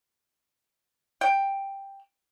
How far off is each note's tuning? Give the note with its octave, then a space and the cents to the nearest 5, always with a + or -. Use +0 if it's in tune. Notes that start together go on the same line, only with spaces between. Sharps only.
G5 +5